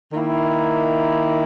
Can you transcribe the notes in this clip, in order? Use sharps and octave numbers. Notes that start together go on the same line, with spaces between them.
D#3 A#3 E4